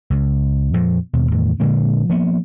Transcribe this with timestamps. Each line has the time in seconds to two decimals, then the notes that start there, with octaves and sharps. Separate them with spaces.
0.10 C#2
0.74 F2 A#2 F3
1.13 D#2 B2
1.31 E2 A2 D#3
1.60 A#2 D3 G#3 A#3
2.09 F3 A#3 B3